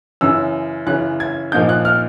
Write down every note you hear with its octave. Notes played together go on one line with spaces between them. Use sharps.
F#2 C#3 E3 E6
F#2 C#3 E3 F#6
G#6
A#2 F3 A#3 D#4 G6
F#6
F6